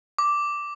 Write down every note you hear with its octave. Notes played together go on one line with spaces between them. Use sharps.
D6